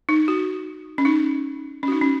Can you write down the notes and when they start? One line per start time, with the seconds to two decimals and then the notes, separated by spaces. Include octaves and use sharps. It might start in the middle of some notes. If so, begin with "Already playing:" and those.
0.09 D#4
0.28 F#4
0.98 C#4
1.05 D#4
1.83 C#4 F#4
1.92 D#4
2.01 C#4